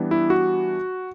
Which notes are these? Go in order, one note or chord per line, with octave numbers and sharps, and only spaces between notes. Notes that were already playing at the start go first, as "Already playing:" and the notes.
Already playing: E3 G3 B3 D4
E4
F#4